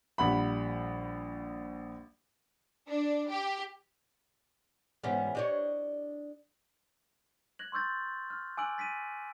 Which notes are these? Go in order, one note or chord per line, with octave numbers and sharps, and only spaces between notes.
A#1 G3 F#5 B5
D4
G4
G#2 E3 G3 B3 C#4 G4
D4 G4 C#5 D#5
F#6 G#6 A#6 F#7
C6 C#6 E6 G6 A6
F6
G#5 D6 E6 F#6 D7 F#7
A6 B6 D7 D#7